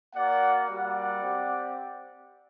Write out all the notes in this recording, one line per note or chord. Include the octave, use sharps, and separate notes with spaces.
A#3 F#4 D5 F#5
G3 A#3 F#4 D5 F#5
C4 G4